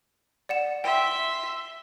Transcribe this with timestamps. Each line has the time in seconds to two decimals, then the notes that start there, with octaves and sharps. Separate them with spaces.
0.49 D5 F#5 E7
0.84 E5 G5 C6